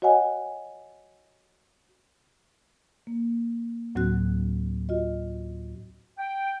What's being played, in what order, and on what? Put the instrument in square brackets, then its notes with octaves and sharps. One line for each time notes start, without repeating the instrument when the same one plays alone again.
[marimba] F#4 C#5 D#5 F#5 G#5
A#3
D2 A2 F#3 C4 F#4 F#6
F4 F#4 D#5
[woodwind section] G5